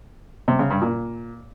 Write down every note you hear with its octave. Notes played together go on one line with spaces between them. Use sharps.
C3
C#3
G2
A#2